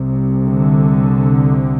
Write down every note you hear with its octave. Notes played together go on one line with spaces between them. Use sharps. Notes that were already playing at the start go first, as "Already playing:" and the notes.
Already playing: C2 C3
D3